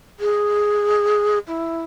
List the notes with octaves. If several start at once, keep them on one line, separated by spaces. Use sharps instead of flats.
G#4
E4